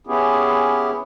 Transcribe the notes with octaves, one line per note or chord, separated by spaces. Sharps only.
B3 C#4 E4 G4 G#4